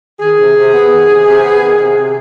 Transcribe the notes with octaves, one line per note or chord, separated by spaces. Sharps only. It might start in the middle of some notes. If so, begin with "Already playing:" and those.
D#3 G#4
C3
C3
B3
D#3
C3
C3
B3
D#3
C3
C3